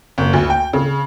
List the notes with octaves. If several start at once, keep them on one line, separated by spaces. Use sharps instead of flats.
F#1
D2
G5
C#3